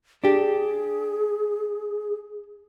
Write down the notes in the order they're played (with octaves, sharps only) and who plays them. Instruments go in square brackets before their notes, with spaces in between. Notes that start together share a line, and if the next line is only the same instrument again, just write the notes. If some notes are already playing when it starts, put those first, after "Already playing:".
[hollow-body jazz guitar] D4 G4 [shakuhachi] G#4